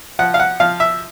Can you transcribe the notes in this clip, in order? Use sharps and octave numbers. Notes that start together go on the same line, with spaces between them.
F3 F#5
F5
F#5
F3 F5
E5